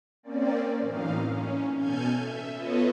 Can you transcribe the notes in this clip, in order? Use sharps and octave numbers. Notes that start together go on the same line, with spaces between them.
A#3 C4 C#4 D5
F#2 A2 E3 D#4 F5
C#4
B2 A4 G#5 F6 G6 G#6
E5
B3 F4 A4 B4 C#5 D#5